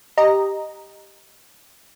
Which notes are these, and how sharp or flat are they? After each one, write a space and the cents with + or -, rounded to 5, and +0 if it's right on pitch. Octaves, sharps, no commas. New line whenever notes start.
G4 +0 D#5 -5 A#5 -5